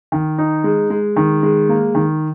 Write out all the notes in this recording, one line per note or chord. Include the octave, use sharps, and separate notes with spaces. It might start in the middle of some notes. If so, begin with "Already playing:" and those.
D#3
D#4
G#3
G#3
D#3
G#3
A#3
D#3